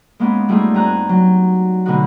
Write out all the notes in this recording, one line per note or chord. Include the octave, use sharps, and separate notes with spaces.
G#3 A#3 B3 C#4 F4
G3 A3 D#4 F4 G#4
G2 C4 G#5 A#5 F#6
F#3
B2 D3 A3 B3 D#4 F#4